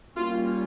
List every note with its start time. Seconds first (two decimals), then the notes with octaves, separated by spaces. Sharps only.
0.16 G3 A#3 C#4 F4